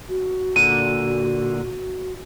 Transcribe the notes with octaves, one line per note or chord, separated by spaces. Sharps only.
F#4
A#2 D3 D#7